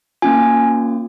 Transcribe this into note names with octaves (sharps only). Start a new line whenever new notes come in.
A#3 C#4 F4 G#5